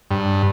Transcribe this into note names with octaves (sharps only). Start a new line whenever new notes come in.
G2